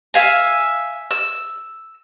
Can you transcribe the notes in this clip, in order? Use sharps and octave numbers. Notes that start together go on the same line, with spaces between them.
E5 F5 G#5
E6